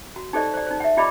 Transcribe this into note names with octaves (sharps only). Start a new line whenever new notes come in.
F#4
D#4 G4 A4 C5 D5 D#5
C5 D5
D#4 C5
E5 F#5
F4 G4 D5 D#5 B5 D6